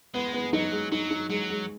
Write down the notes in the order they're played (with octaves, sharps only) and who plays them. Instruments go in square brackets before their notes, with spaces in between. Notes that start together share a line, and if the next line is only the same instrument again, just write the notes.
[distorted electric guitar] G#3 [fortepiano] B3
[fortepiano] B3
[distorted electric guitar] F#3 [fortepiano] D#4
[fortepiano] G#3
[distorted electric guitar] F#3 [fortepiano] D#4
[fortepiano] D#4
[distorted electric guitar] F#3 [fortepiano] G#3
[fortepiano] G#3